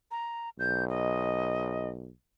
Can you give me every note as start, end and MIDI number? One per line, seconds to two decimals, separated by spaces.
0.11 0.49 82
0.59 2.10 35
0.59 0.85 91
0.89 1.89 75